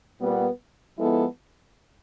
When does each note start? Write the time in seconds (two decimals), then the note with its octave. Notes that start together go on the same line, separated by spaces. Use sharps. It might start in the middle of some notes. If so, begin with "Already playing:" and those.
0.19 A#2 G3 B3
0.97 F3 G#3 B3 E4 A4